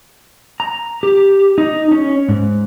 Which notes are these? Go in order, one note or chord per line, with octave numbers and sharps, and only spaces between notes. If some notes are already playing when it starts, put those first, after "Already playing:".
A#5
G4
D#4
C#4
G#2